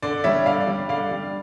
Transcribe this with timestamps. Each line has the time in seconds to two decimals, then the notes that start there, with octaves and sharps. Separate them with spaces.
0.02 D3 D5
0.24 G3 C#5 E5
0.46 D3 D5 F5
0.60 D5
0.67 G3
0.89 D3 D5 F5
1.11 G3